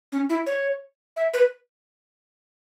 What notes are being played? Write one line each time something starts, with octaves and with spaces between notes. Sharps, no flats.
C#4
E4
C#5
E5
B4